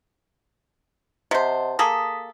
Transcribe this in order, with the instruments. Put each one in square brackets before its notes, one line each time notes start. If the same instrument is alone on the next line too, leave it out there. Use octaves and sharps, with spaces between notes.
[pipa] C3 C5 [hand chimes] D#5 F#5 A5
[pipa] A#3 G#4 A4 [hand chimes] D#6 A#6 B6